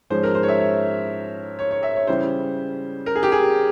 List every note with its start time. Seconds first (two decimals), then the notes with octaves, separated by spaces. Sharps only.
0.10 G#2 F3 G#3 C#4 C5
0.23 A#4
0.35 C5
0.43 C#5
0.48 E5
0.59 C#5
1.59 C#5
1.71 C#5
1.83 E5
1.95 C#5
2.07 C#3 E3 G3 C#4 C5
3.06 A#4
3.15 G#4
3.23 G4
3.32 G#4